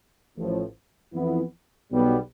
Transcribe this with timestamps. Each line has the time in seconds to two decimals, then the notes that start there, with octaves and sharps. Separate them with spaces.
0.36 A1 A2 F3
1.13 F2 E3 B3 E4
1.91 B1 B2 G3 B3